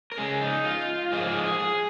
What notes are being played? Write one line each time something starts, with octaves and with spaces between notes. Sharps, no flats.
A#4
C#3 G#3 G#4
D#4
F4
G#2 F3 A#3 G#4
G#4
G#4
G#4